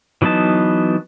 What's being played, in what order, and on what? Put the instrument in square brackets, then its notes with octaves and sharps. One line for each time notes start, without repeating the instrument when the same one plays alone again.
[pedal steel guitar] E3 F#3 B3 D#4 A5